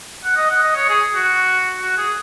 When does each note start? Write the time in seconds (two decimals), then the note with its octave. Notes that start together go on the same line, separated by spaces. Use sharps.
0.24 F#5
0.37 D#5
0.50 F#5
0.63 D#5
0.76 C#5
0.89 G#4
1.15 F#4
1.80 F#4
1.98 G#4